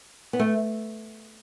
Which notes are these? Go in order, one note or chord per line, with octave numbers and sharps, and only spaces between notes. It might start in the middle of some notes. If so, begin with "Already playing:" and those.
B3
A3